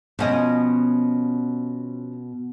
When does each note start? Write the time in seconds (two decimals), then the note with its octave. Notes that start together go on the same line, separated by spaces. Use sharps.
0.19 B2 F3 C#4 D#5